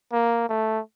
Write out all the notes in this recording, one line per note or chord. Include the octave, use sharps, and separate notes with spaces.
A#3
A3